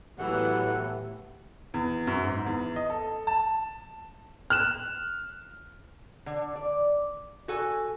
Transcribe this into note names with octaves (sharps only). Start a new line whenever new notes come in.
A2 E3 F#3 B3 G4 F#5
E2
F#2
G#2
E2
D#5
A4
A5
F6 F#6 E7
D3
D5
F#4 A4 G#5